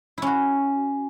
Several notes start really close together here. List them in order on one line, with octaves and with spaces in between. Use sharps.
E4 C#4 F#4